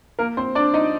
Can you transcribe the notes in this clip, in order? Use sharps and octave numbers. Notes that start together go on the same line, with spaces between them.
A#3 A#4
C4 C5
D4 D5
D#4 D#5